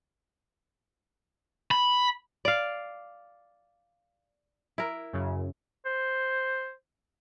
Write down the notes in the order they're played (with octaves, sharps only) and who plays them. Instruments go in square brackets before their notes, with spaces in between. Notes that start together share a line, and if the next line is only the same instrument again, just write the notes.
[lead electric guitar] B5
[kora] D5 F5
E4 A#4
[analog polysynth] F#2 C#3
[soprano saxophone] C5